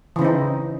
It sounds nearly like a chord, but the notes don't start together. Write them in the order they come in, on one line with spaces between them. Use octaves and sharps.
E3 C#3 C4 D#4